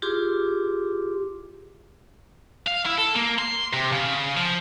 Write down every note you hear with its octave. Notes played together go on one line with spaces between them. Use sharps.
E4 F4 G4 G#4 C6 D6
F5
E4
A4
A#3
C6
C3
C#3
F3